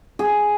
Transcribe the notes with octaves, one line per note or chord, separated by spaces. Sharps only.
G#4